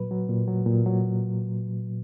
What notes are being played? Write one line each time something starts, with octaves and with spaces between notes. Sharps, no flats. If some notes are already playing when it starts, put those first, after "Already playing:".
Already playing: A#2 F#3 B4
F#3
A#2
F#3
A#2
F#3